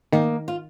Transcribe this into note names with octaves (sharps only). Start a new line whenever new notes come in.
D#3 A#3 D#4
F4